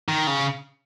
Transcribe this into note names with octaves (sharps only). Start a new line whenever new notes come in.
D#3
C#3